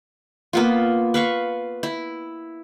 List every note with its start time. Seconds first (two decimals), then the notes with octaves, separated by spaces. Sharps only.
0.53 A#3 B3 F4
1.14 B4 F5 C#6
1.83 E4